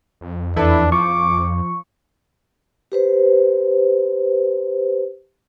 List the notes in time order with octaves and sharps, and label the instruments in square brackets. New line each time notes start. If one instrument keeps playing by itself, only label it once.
[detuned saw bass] F2
[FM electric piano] E2 [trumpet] D4 [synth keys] E4 A4 B4
[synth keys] F3 [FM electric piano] C#6 [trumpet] D6
[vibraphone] G4 B4 C5